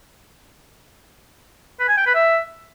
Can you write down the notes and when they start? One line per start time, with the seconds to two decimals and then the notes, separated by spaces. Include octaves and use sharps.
1.80 B4
1.88 G#5
1.97 G5
2.06 B4
2.15 E5